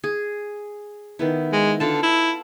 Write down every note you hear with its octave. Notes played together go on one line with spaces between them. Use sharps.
G#4
D#3 B3 E4
G#3
D3 F4 A4 A5
E4